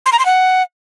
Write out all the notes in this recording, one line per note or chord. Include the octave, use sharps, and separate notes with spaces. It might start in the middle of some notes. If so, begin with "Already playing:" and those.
C6
A#5
C6
F#5